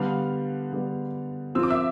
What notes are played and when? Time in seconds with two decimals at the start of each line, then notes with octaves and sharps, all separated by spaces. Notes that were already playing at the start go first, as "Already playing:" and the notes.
Already playing: D3 G3 B3 F5 F6
0.73 D3 G3 B3
1.55 F3 C4 F4 E6
1.63 D6
1.70 E5 E6